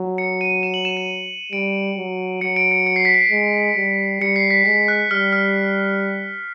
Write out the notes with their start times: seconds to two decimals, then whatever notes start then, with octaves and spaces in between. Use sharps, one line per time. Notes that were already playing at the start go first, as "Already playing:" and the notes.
Already playing: F#3
0.18 C#7
0.41 D#7
0.63 E7
0.74 F#7
0.85 E7
0.97 D#7
1.52 G3 D7
1.97 F#3
2.41 F#3 C#7
2.56 D7
2.71 C#7
2.86 C#7
2.96 C7
3.05 B6
3.14 C7
3.31 G#3
3.77 G3
4.21 G3 C#7
4.36 C7
4.50 B6
4.65 G#3 B6
4.88 F#6
5.11 G3 F6
5.33 F6